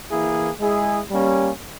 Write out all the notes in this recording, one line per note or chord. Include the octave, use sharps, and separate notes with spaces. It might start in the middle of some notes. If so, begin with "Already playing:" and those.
E3 A#3 E4 G#4
G#3 E4 G#4
G3 A#3 C#4 G4